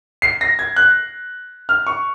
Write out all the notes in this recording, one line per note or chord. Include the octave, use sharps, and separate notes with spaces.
C7
A#6
G#6
F#6
F6
C#6